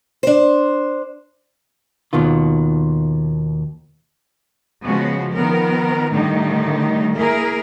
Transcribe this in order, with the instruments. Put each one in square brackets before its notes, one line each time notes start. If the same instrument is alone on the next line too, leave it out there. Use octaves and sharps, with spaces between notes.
[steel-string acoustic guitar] D4 C5
[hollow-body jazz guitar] D#2 B2 D#3 F4
[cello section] C#3 F3 G#3 B3 F#4
D#3 F3 B3 A#4
A2 D3 D#3 G3 A3 D#4
A#3 E4 G#4 A#4